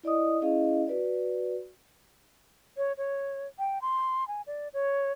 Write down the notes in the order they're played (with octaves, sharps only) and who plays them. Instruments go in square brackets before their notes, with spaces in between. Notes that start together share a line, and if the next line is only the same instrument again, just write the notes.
[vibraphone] E4 D5 D#5 D#6
C#4 E4 G#4 D#5 F5
F#4 B4 D5
[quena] C#5
C#5
G5
C6
G#5
D5
C#5